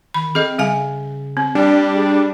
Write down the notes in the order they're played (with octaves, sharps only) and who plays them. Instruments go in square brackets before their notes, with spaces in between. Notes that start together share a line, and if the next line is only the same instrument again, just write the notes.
[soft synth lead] D#3 [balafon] B5
[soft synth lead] C4 [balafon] G#4 A4 D#5
[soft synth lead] C#3 [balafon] G3 F5 G#5
[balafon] C4
[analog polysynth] G3 D4
[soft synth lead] G#4